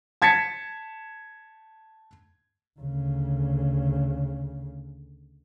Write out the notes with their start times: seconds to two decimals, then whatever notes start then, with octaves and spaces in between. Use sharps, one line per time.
0.22 A5 G#6 A6 B6 C#7
2.79 D2 C#3